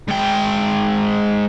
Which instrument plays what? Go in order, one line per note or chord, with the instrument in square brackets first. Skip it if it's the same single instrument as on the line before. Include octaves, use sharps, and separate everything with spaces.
[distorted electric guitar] G#2 G5